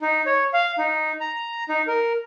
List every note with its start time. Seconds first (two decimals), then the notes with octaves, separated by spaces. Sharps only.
0.01 D#4
0.26 C#5
0.53 F5
0.78 D#4
1.21 A#5
1.69 D#4
1.87 A#4